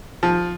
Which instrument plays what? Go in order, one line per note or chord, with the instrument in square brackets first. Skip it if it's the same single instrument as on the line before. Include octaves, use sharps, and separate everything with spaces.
[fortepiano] F3